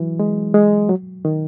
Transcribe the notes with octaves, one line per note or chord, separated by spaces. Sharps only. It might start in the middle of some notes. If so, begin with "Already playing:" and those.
Already playing: E3 F#3
G#3
G#3
F#3
D#3